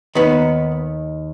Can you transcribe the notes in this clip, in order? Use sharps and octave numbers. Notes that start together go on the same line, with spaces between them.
D#2 D#3 B3